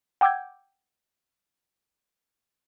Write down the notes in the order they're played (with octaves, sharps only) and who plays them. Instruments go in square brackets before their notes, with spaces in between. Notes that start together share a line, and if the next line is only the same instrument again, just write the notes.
[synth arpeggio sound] F#5 G5 D6 E6 G6 G#6